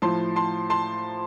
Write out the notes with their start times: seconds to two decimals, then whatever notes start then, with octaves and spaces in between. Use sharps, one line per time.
0.02 A2 F3 A5 C6
0.36 A5 C6
0.70 A5 C6